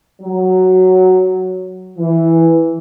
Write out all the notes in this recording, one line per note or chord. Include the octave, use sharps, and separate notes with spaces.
F#3
E3